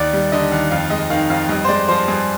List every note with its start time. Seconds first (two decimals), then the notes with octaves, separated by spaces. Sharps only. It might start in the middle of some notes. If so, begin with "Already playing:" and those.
Already playing: D#2 D5
0.13 G3
0.32 D3 D#5
0.52 D#2
0.71 F2 F5
0.90 G#3 D#5
1.10 D#3 F5
1.30 F2 F5
1.49 G2 D#5
1.64 C5
1.69 G#3 D5
1.88 F3 C5
2.08 G2 G#4